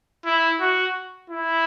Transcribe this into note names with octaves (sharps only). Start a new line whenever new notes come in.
E4
F#4
E4